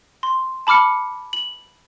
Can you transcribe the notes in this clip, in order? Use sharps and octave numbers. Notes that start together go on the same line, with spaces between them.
C6
A5 B5 D6 F6 C#7
F#7